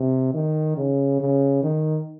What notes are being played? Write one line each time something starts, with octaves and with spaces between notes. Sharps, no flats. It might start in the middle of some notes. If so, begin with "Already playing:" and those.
Already playing: C3
D#3
C#3
C#3
D#3